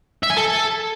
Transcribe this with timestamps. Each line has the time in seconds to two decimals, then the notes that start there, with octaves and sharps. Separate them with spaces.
0.23 E5
0.30 G#5
0.37 A4